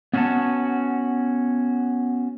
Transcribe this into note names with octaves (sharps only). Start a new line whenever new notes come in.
B3 C#4 F#4 F5 F#5 A5